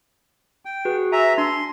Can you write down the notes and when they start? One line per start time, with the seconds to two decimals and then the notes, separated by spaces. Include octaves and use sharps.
0.65 G5
0.85 F#4 G#4 B4
1.12 E5 G#5 A#5
1.38 D4 C6